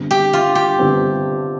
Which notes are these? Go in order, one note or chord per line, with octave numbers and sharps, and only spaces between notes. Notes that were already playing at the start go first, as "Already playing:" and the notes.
Already playing: G1 G2 D3 G3 C4
G4
F4
G4
G1 G2 D3 G3 C4